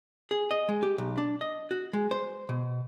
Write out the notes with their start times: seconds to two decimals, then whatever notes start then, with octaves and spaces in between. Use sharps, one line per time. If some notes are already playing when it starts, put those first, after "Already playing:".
0.31 G#4
0.51 D#5
0.69 G#3
0.83 G4
0.98 B1
1.18 D4
1.41 D#5
1.71 F#4
1.93 G#3
2.11 C5
2.49 B2